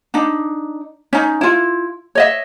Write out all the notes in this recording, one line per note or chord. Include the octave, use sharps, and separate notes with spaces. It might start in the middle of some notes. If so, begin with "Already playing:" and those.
D4 D#4
C#4 D#4
E4 F4
C#5 D#5 E5